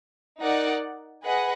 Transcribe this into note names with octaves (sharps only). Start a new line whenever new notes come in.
D#4 A#4 D5 F#5
G#4 B4 D#5 F#5